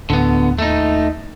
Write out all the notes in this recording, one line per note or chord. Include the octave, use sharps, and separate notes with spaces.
D2 A2 D3 B3
D#2 A3 D#4